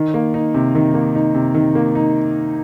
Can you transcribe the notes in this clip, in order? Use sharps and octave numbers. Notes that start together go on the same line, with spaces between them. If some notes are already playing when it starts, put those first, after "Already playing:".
Already playing: D#3
A#3
D#4
C3
D#3
A#3
D#4
C3
D#3
A#3
D#4